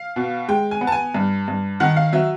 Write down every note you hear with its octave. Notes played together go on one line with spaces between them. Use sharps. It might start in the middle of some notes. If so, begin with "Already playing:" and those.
Already playing: F5
B2
G#3 G5
G#5
B3
A5
G#5
G2
G2
D#3 F#5
F5
F#3 E5